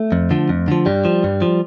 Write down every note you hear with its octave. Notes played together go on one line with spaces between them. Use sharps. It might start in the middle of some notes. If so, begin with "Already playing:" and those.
Already playing: A3
F2
D3 F3
F2
D3 F3
G2 G3
F3
G2
F3